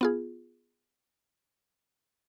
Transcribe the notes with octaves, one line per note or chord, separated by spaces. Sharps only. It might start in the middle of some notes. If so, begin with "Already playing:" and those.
B3 F4 G#4